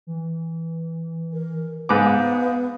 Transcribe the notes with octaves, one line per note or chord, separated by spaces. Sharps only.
E3
A#4
G#2 B3 B4 F5 D6